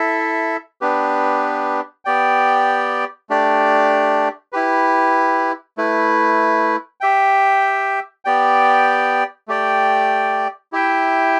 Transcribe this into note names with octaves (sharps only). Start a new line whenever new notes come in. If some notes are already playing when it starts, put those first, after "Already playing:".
Already playing: E4 A4 E5
B3 D4 G4 B4
B3 G4 D5 G5
A3 D4 G4 D5
E4 G4 B4
A3 E4 B4
G4 E5 G5
B3 G4 D5 G5
A3 G4 D5 G5
E4 G4 E5 G5